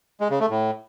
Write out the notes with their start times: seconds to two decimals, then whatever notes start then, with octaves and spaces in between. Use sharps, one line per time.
0.20 G#3
0.30 C#3
0.40 A3
0.50 A2